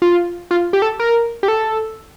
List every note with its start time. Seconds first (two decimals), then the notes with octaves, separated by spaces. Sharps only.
0.02 F4
0.51 F4
0.73 G4
0.82 A4
1.00 A#4
1.43 G4
1.48 A4